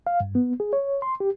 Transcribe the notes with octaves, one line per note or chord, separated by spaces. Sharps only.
F5
G2
B3
G#4
C#5
C6
G4